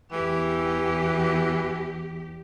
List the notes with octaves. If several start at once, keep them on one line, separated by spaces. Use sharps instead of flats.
E2 E3 G4